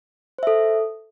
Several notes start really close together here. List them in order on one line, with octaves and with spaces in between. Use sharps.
C5 E5 A4